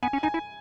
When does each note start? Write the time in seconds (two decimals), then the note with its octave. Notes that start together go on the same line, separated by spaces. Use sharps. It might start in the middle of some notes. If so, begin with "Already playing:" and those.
0.03 B3 G#5
0.13 C#4
0.23 D#4 G#5
0.34 E4